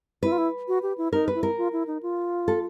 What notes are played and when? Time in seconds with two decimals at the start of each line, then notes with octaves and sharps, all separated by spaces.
0.23 E4 B4
0.32 F4
0.38 E4
0.68 F#4
0.83 G4
0.98 E4
1.13 D#4 A#4
1.28 B4
1.35 E4
1.43 A#4
1.58 F4
1.73 E4
1.87 D#4
2.03 F4
2.48 A4